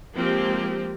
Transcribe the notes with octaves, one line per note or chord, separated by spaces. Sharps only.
F3 G#3 A#3 C4 G4